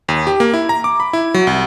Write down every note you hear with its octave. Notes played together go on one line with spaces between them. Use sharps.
D#2
G4
A#3
E4
A#5
D6
B5
E4
F#3
C2